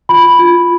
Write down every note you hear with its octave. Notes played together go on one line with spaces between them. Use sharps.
F4 B5
F4